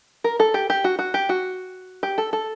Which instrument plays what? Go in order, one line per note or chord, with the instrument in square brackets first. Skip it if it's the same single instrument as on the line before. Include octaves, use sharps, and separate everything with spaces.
[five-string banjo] A#4
A4
G4
G4
F#4
F#4
G4
F#4
G4
A4
A4